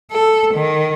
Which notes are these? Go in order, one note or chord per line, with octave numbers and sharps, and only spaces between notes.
A4
D#3